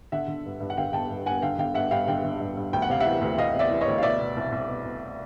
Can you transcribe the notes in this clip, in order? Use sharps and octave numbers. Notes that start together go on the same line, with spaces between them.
D3 E5 F#5
D3
G2
G2
F#5
D3 F5 G5
D3 G5 A5
G2
G2 F#5 G#5
D3 F5 G5
D3 F5 G5
G2 E5 F#5
G2 F5 G5
D3 F5 G5
D3
G2
G2
D2 G5
F#5
C3 F5
E5 F#5
E3
D2
D2 D#5 F5
C3
D5 E5
E3
C#5 D#5
D2
F5
B2 D5 E5
B2
C2
C2
B2
B2